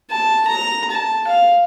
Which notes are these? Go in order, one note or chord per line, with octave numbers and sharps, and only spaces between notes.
A5
A#5
A5
F5